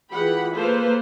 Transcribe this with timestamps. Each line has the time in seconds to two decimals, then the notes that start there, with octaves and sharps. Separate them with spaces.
0.10 E3 F4 G4 G#4 F#5 B5
0.53 A#3 A4 B4 C5